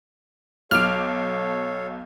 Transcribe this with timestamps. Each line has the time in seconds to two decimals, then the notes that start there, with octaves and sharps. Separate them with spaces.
0.71 B1 A4 C#5 F5 D6 F6 D7